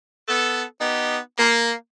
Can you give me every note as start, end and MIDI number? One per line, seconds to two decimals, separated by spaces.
0.27 0.63 59
0.27 0.63 69
0.80 1.17 59
0.80 1.17 63
0.80 1.17 67
1.38 1.73 58